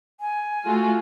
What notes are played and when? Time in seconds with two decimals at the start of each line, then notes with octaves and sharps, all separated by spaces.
0.21 G#5
0.65 A3 F4 F#4